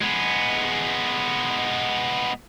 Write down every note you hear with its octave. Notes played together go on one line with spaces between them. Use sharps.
G#3 B3